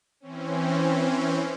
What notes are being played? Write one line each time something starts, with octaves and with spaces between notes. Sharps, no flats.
E3 C4 C#4